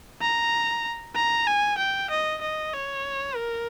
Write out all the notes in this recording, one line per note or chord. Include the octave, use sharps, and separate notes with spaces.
A#5
A#5
G#5
G5
D#5
D#5
C#5
A#4